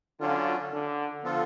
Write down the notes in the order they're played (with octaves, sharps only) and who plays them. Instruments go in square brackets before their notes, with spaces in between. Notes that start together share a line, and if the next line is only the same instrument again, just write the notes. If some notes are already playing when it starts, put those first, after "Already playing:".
[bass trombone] D3 [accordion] F#3 C#4 F4
[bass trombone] D3
[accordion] D3 F3 B3 F4 A4